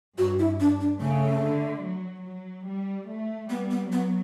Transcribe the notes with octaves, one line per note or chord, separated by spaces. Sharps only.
G2 F#4
E4
D4
D4
C#3 A3
D3
F#3
F#3
G3
A3
G3 B3
B3
F#3 B3